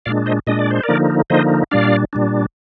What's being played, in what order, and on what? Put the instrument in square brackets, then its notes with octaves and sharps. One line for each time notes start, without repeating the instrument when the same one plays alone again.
[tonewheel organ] A#2 G#3 D4 D5 F5
C5 D#5
A#2 G#3 D4 D#5
D5
C5
A#4 D5
D3 F3 A#3 D#4
D3 F3 A#3 D#4 C5 D#5
A#2 G3 D4 D5 F5
A#2 G3 D4